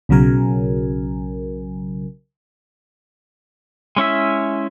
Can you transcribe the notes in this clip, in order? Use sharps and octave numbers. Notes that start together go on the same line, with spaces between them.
B1 C#3 F#3 A#4 G#5
G#3 C#4 E4 E5